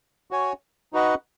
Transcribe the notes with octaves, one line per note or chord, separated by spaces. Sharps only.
F#4 C#5 G#5
D#4 F#4 B4 D#5 F#5